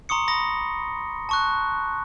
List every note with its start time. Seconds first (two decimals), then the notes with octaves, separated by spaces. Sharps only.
0.09 A#5 C6 C#6 D#6 C#7
0.28 B5 D#6 A#6 G7
1.29 A5 C#6 F#6